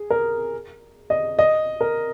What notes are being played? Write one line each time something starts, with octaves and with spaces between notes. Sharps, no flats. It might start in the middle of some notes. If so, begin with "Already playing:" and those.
Already playing: G#4
A#4
D#5
D#5
A#4